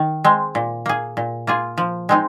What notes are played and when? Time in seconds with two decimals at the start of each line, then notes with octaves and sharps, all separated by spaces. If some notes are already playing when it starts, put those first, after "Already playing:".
Already playing: D#3
0.24 G#3 C4
0.55 A#2
0.86 A#3 G#4
1.17 A#2
1.47 A#3 F4 G#4
1.78 F3
2.09 G#3 C4 D#4